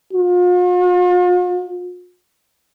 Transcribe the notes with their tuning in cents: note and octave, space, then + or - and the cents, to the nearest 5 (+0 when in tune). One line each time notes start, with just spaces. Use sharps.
F4 +45